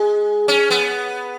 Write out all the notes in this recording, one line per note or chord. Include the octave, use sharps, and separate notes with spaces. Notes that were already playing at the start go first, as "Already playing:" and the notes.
Already playing: G#3
C#4
B3